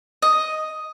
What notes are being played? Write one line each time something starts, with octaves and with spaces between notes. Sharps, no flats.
D#5